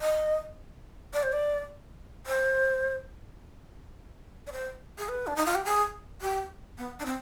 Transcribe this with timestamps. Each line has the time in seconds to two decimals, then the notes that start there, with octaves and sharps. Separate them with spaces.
0.01 D#5
1.14 D5
1.23 C5
1.32 D5
2.27 C5
4.47 D5
4.52 C5
4.98 G#4
5.09 B4
5.27 D4
5.36 D#4
5.46 F4
5.55 G4
5.65 G#4
6.21 G4
6.78 B3
7.00 D4
7.06 C4